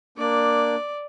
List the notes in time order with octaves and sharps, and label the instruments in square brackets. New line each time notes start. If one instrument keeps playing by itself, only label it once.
[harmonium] A#3 D4 [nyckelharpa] D5